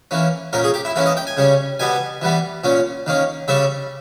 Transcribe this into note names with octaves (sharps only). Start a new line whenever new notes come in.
E3 A#3 C#4
A#2 A#3 C#4 A#4
G#4
G4
E4
E3 A#3 C#4 E4
D#5
G5
G#5
C#3 G3 C#4
B2 G3 B3 G#5
E3 G3 B3
A#2 A#3 C#4
D#3 A#3 C#4
C#3 G3 C#4 E5